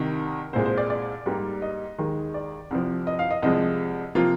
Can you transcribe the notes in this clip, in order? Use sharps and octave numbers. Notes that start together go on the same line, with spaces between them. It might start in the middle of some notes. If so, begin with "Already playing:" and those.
Already playing: C2 C3 D#3 A#4
C2 A#2 G#3 C5
C5
D5
D5
G#2 G3 A#3
D#5
D#2 D#3 G#3
D5
C2 C3 F3
D#5
F5
D#5
C2 C3 F3 G#3 D#5
C3 F3 A#3 F4